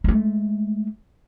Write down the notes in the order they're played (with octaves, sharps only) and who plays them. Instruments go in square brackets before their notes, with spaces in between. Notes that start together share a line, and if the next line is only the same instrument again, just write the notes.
[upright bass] G#3 A3